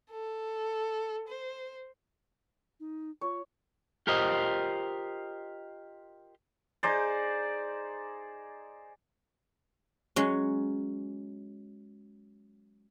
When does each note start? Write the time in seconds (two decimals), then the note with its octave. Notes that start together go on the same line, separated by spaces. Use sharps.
0.11 A4
1.28 C5
2.80 D#4
3.21 F4 C#5
4.07 F4 G4 A#4 C5 D#5
6.83 D#4 G#4 C5 D5
10.16 F#3 G#3 C#4